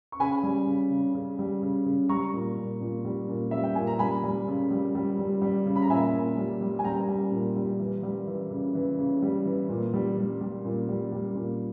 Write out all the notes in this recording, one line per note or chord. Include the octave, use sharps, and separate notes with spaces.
C#6
C#3 G#5 B5
G3
C#3
C#3
C#3
G3
C#3
C#3
G3 A#5 C#6
A#2
A#2
A#2
G3
A#2
G3 E5
G5
A#2 G#5
A#5
G3 G#5 B5
G3
C#3
G3
G3
G3
G3
C#3
B5
A#5
A#2 E5 G#5
A#2
G3
G3
G#5
G3 G5 A#5
G3
A#2
G3
E3
G3
E3
C#3
E3
C#3
G3
E3
A#2
G3
G3
G3
A#2
G3
G3
A#2